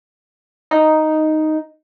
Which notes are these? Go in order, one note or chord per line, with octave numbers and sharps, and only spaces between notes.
D#4